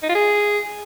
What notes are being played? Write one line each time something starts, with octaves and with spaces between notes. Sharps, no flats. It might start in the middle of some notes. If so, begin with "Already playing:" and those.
D#4
F4
G#4